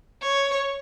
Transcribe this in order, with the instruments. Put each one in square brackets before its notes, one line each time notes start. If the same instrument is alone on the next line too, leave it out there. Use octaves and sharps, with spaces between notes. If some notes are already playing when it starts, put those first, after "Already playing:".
[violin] C#5